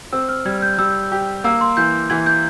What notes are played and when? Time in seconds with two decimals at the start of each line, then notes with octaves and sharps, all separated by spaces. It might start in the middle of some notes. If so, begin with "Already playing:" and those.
0.13 C4 E6
0.29 F6
0.45 G3 G#6
0.62 G6
0.78 G3 E6
1.12 G4
1.44 A#3 E6
1.61 C6
1.77 E3 G6
2.10 E3 G#6
2.26 G6